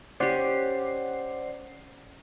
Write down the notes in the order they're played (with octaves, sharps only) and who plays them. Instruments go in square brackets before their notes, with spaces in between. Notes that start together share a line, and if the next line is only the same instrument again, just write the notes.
[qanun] C#4 G4 [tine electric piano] C5 [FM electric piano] D5 F#5 C7